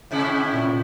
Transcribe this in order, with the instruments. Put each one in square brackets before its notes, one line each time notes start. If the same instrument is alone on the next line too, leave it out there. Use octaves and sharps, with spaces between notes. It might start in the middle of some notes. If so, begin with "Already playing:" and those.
[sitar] A2 C3 E4
[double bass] A#2